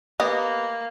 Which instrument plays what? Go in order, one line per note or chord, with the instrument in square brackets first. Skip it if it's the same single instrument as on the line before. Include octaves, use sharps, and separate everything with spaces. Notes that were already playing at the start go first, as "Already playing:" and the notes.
[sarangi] A#3 [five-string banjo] B3 G4 D#5